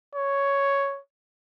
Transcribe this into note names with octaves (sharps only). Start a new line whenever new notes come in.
C#5